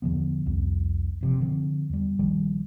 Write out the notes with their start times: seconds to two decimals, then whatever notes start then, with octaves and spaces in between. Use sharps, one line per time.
0.02 E2 D3 F3 B3
0.46 C2 F2
1.21 F#1 C3 F3
1.41 D3 E3 F3 C4
1.90 E2 G3
2.19 A#1 D#3 F3 G3